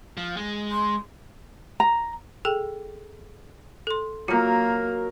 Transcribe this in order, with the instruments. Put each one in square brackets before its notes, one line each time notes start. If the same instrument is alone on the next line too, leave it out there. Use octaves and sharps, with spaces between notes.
[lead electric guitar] F3
G#3
[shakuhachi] C6
[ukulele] A#5
[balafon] G#4 A4 G5
A4 C6
[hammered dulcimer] F#3 A#4 [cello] A#3 [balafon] F4 F#4